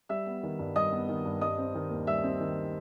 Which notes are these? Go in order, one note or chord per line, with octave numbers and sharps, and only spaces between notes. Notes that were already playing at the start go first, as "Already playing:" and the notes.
G3 E5 E6
B3
D#3
G2
G3 D#5 D#6
B3
D#3
G2
G3 D#5 D#6
C4
D#3
D#2
G3 E5 E6
C4
D#3